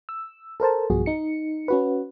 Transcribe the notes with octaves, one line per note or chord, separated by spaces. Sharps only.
E6
A4 A#4 C5 A5
B1 G2 B2 F3 F#4 G#4
D#4 C#7
C#4 F#4 B4